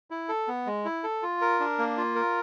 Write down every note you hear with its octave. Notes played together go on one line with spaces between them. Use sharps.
E4
A4
B3
G#3
E4
A4
F4
A#4
D4
A#3
F4
A#4